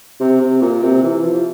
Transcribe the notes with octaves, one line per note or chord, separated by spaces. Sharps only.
C3
C3
A#2
C3
E3
F3